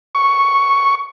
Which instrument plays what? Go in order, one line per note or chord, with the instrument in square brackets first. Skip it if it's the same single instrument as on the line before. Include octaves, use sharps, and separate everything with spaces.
[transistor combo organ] C#6